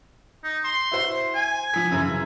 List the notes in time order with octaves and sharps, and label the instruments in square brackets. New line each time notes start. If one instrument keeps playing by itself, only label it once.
[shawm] D#4
C6
[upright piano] E4 F#4 C5
[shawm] G#5
[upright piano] F3 B6
F#2 C#3 E3